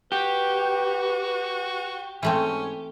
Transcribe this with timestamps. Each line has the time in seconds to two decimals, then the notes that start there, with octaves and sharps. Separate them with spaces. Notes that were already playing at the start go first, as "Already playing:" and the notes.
0.12 F#4 G4 B4
2.23 G#2 E3 A3 C4 C#4